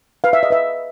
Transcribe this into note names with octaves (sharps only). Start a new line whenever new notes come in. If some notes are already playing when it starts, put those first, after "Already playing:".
B4 F5
E5
D#5
B4 E5